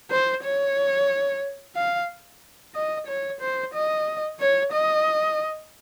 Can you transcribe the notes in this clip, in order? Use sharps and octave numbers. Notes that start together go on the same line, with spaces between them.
C5
C#5
F5
D#5
C#5
C5
D#5
C#5
D#5